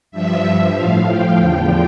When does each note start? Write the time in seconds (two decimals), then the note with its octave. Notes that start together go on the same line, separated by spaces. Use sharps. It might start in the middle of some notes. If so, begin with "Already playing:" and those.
0.11 G2 F3 E5
0.74 A2 F3 F5
1.06 G5
1.37 E2 D3 F3